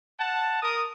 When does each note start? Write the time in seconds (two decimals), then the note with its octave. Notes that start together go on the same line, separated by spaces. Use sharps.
0.19 F#5 A5
0.63 A#4 D#6